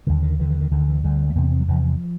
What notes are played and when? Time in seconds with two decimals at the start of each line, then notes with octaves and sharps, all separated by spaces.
0.07 D#2 D3 G3
0.23 D#3
0.39 D#2 D3 E3
0.50 E3
0.61 D#3
0.71 D2 D3 D#3
0.88 E3
1.03 D2 D3 G3
1.30 A3
1.35 E2 C3 A#3
1.44 B3
1.52 C4
1.61 F#3
1.68 E2 C3 F3